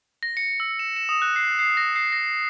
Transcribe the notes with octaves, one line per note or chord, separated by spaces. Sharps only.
A#6
C#7
E6
E7
E7
D#6
F#6
C7
C7
A#6
C7
A#6